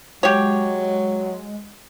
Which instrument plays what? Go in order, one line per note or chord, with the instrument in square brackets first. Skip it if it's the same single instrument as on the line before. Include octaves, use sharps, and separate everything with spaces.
[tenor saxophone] F#3 [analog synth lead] G#3 [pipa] G4 C#5